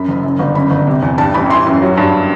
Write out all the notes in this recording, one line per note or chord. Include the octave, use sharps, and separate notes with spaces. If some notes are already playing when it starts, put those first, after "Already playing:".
Already playing: F#2 B5
F#1
F#2
G1
F#2 B5
G1
C3
E2
G2 A5
A1 B5
E3 C6
F#2
F#3
G2